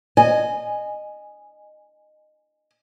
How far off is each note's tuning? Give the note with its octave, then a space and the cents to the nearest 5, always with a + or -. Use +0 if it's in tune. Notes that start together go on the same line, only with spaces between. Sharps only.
D#5 -20 G#5 +0